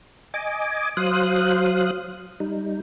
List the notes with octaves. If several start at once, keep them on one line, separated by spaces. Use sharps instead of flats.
D#5 G#5 D6
F#3 C5 F5 D#6 F#6
G3 D#4